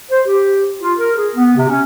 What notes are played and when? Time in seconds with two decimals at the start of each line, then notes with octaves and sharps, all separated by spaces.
0.12 C5
0.27 G4
0.82 F4
0.99 A#4
1.17 G#4
1.36 B3
1.57 C3
1.69 C#4